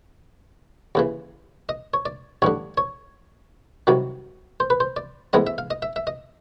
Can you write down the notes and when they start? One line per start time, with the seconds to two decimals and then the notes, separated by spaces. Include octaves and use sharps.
0.95 D#2 C#3 E3
1.69 D#5
1.94 C#5
2.06 D5
2.42 A1 G2 D3 C#5
2.78 C#5
3.87 C2 C3 D#3 F#3
4.60 C5
4.70 B4
4.80 C5
4.97 D5
5.33 A1 G#2 E3 G#3 B3 D#5
5.47 E5
5.58 F5
5.71 D#5
5.82 E5
5.96 E5
6.07 D#5